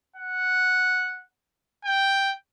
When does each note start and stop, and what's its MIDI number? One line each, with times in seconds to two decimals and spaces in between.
0.16 1.24 78
1.85 2.33 79